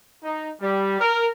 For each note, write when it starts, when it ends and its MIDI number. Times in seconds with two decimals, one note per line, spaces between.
0.24 0.49 63
0.61 0.98 55
1.00 1.27 70